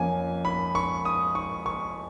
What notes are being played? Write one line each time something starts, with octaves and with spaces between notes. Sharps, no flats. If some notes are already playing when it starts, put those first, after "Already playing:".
Already playing: F2 F3 A#3 C#4 G#5
B5
C#6
D#6
C#6
C#6